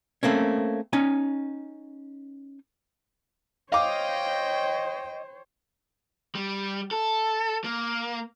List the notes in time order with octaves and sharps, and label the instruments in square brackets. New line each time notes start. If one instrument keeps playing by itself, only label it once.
[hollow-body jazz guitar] A3 A#3 C4 C#4
C#4 D#4 G#5
[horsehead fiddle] C5 C#5 [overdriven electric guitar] D#5 [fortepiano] F5 D6 [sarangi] G5
[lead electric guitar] G3
A4
A#3